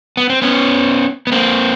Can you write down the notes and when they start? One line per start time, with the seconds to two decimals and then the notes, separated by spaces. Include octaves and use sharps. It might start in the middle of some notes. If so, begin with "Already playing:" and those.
0.17 B3
0.30 C4
0.42 B3 C#4
1.27 B3
1.32 A#3 C4